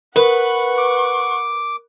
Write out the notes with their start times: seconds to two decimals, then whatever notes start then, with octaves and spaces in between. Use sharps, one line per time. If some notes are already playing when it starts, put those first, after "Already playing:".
0.16 A#4 B4 F#5 C#6
0.78 D6